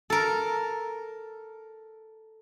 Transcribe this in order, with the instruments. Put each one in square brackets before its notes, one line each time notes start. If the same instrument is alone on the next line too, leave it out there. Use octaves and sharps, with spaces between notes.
[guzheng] A4 A#4